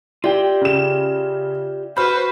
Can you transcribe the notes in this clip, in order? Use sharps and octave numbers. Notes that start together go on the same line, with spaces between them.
F4 G4 D5 E5 G5
C#3 E7
F#4 B4 C5 B5 F6 G6